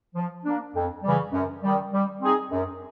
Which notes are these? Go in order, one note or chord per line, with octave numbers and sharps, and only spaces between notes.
F3
A#3 D4
F2
C#3 E3 G3
F#2
D#3 G3
G3
C4 D#4 G#4
F#2